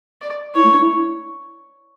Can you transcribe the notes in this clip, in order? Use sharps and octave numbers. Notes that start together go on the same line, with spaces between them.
D5
E4 C#5
A3
D4
E4